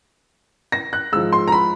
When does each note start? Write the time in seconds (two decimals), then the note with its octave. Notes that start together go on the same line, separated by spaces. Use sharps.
0.72 A#6
0.93 F#6
1.12 G#2 F3 E6
1.33 C6
1.48 A#5
1.52 B5